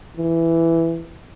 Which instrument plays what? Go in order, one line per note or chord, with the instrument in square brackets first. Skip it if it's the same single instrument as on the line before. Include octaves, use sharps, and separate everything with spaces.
[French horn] E3